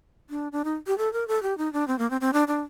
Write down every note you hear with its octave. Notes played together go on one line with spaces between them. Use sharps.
D4
D4
D#4
G4
A4
A#4
A4
G4
D#4
D4
C4
A#3
C4
C4
D4
D4